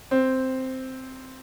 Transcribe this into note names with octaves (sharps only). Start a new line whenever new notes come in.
C4